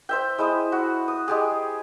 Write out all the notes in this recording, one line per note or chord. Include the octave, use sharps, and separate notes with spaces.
C5 E5 G5
G#3 E4 C5 D#6
F#4
D#6
G#3 G4 G#4